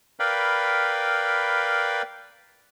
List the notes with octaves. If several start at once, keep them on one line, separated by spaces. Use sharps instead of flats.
A#4 B4 D5 F5 G5 B5